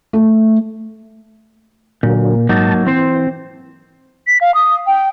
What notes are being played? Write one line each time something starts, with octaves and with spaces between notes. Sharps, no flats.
A3
A#2 D3 F#3 A#3
G#2 F#3 A#3 D#4 A5
E3 C4 C5
B6
F5
D#6
G5